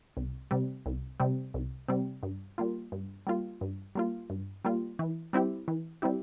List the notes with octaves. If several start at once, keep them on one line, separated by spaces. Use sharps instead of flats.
C2
C3 G3
C2
C3 G3
C2
C3 G3
G2
G3 A#3 F4
G2
G3 A#3 F4
G2
G3 A#3 F4
G2
G3 A#3 F4
E3
G3 C4 E4 G4
E3
G3 C4 E4 G4